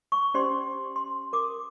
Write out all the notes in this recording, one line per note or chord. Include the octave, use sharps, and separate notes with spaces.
C#6
C#4 G4 C5 D5 C6
C6
A#4 D6 D#6